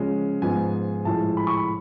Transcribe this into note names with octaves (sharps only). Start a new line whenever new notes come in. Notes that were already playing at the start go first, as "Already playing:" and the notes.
Already playing: C#3 F3 G#3
G#2 F3 G#3 B3 G#5
A2 F3 G#3 A5
B5
C#6
B5